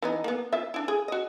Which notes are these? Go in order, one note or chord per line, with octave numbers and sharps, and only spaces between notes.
E3 B3 D#4
A#3 B3
F4 E5
D4 E4
G#4
F#4 D#5